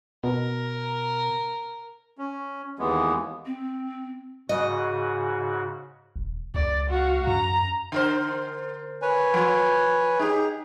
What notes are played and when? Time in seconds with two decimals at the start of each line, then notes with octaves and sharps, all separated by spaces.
0.24 B2 A#4
2.18 C#4
2.79 D#2 E3 G#3 B3
3.44 C4
4.49 G#2 C#3 F#4 D#5
6.16 D#1
6.54 C#2 D5
6.90 F#4 F5
7.27 F#2 A#5
7.92 D3 A#4 C5
9.02 B4 C#5 G#5
9.34 F3
10.19 D#4 G4 G#4